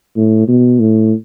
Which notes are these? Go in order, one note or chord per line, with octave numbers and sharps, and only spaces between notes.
A2
B2
A2